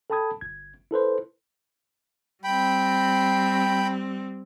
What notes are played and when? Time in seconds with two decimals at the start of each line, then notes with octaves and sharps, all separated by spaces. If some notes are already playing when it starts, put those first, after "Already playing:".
0.10 A4 G5 A5 B5 D#6 G#6
0.41 G1 G#6
0.91 E4 A4 B4 C5
2.44 G3 C4 G5 B5